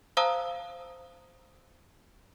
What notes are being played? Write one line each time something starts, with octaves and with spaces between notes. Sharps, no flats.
C5 F5 A5 A#5 D#6 E6